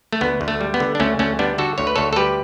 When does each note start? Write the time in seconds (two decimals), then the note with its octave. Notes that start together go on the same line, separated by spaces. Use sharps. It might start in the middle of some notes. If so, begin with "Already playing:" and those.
0.13 A3
0.21 D2 B3
0.41 D2
0.48 A3
0.61 G3
0.74 B3
0.80 D3
0.95 D4
1.00 D2 A3 C#4
1.19 D2 A3 C#4
1.39 G3 B3 D4
1.58 D3 F#4 A4
1.78 D2 C#5
1.87 B4
1.96 D2 A4 C#5
2.13 A4
2.16 G3 G4 B4